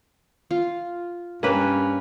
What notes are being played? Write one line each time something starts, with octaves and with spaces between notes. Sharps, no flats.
F4
G2 A#3 C#4 B4